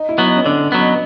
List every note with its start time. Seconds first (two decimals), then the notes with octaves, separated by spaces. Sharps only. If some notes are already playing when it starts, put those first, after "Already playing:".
Already playing: D#4
0.09 E4
0.18 F#3 B3
0.27 D#4
0.36 C#4
0.46 D3 D4
0.72 F#3 B3
0.81 D#4